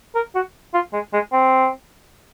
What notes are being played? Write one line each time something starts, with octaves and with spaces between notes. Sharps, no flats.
A#4
F#4
F4
G#3
G#3
C4